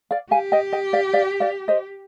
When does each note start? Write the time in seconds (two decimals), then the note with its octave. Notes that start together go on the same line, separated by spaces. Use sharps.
0.11 D5 F5
0.31 G4 F5 G#5
0.52 D#5 G5
0.73 D#5 G5
0.93 D5 F5
1.13 D5 F5
1.40 D5 F5
1.68 C5 D#5